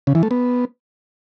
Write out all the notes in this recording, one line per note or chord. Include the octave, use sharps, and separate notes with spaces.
C#3
E3
A3
B3